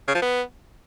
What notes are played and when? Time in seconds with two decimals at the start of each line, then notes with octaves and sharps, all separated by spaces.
0.08 C#3
0.15 F3
0.22 B3